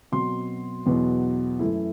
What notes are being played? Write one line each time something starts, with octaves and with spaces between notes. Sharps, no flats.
B2 F#3 C4 C6
E2 B2 F#3 B3
F#2 E3 A3 E4